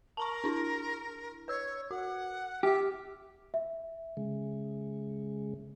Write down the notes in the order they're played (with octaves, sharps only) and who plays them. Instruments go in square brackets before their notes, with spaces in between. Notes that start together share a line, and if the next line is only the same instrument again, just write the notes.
[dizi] A#4 [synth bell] A5 A#5 C#6
[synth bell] D4 E4
[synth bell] B4 E6 G#6 [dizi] C#5
[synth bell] F#4 [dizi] F#5
[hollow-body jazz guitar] G4 [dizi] E5 [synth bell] F6
[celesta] E5
[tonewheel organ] C#3 G#3